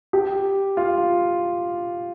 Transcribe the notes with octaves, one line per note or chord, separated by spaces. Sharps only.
G4
F4